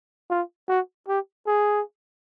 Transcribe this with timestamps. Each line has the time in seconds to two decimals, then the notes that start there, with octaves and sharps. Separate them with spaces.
0.30 F4
0.68 F#4
1.08 G4
1.47 G#4